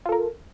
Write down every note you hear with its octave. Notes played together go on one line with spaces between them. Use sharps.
F4 A4 A#4